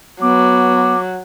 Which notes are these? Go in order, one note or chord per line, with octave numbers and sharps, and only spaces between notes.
F#3 B3 D6